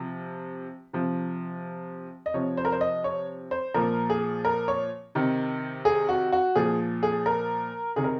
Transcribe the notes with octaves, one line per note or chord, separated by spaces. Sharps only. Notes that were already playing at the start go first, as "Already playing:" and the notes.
Already playing: C3 F3
C3 F3
D#5
C3 F3 C#5
C5
A#4
C5
D#5
C#5
C5
A#2 F3 A#4
G#4
A#4
C#5
C3 D#3
G#4
F#4
F#4
A#2 F3 G#4
G#4
A#4
C3 D#3 G#4
A#4